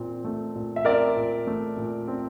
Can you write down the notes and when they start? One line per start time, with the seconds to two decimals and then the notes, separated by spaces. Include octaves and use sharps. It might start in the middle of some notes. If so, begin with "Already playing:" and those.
Already playing: A#2 C4
0.25 A3
0.55 A#2
0.76 E5
0.85 C4 A#4 D5
1.16 A#2
1.47 A3
1.77 A#2
2.07 C4